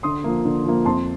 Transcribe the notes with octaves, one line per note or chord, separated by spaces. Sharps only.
D3 C6 D#6
F3 A#3
D3
F3 A#3
F2 A5 C6